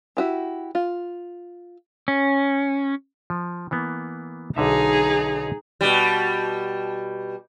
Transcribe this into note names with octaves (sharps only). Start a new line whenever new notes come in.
E4 F#4 G4
F4
C#4
F3
E3 A#3 B3
B1 D3 D#4 G#4 E5
B2 G3